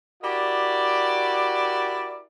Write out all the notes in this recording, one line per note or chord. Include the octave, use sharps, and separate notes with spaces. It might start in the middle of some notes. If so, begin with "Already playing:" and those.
E4 F#4 G4 A#4 D5